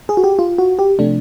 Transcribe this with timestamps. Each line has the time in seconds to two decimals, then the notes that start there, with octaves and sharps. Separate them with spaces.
0.09 G#4
0.17 F#4
0.24 G4
0.39 F4
0.58 F#4
0.79 G4
0.99 C3 F3 A3 D4